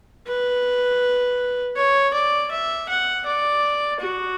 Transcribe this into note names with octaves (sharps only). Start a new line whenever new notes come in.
B4
C#5
D5
E5
F#5
D5
F#4